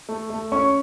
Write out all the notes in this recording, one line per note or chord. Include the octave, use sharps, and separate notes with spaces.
A3
A3
C#4 C#6